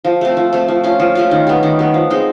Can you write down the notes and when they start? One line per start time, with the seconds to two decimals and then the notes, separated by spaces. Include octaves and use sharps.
0.05 F3
0.21 A3 C4
0.37 F3
0.53 A3 C4
0.68 F3
0.84 A3 C#4 F4
1.00 F3
1.15 A3 C#4 F4
1.31 D#3
1.47 G3 B3
1.63 D#3
1.79 G3 B3
1.94 F3
2.10 G#3 C4 D#4